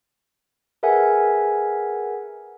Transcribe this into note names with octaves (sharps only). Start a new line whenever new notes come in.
G#4 A#4 B4 E5 F#5 G#5